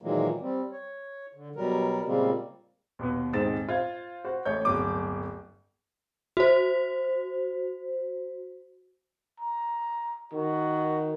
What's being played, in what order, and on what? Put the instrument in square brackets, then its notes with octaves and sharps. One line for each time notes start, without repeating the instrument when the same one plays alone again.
[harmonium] A#2 D#3 E3 F#3 G#3 A#3
G3 C4
C#5
D3
B2 F#3 G3 A#4
A#2 C#3 G3 G#3 A#3 C4
[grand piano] D#2 B2 B3
D#1 G#2 C4 D#4 A6 E7
F4 C5 G#6
F#4 C5
A1 A3 C#5 G6
D1 G1 F#3 D6
[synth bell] F#4 C5
[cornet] A#5
[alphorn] D#3 [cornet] F#4